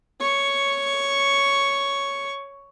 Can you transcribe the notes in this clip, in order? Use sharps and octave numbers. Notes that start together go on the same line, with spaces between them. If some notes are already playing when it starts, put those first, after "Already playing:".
C#5 C#6